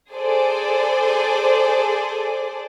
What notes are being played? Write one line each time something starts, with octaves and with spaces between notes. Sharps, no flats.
G#4 A4 C5 D5